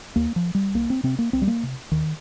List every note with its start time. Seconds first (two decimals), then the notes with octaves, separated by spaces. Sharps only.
0.16 D#2 A#3
0.36 F3
0.55 G3
0.74 C2 A#3
0.90 C4
1.03 C3 C4
1.19 A#3
1.33 C2 C4
1.42 G3
1.47 A#3
1.63 C3
1.92 D#2 D#3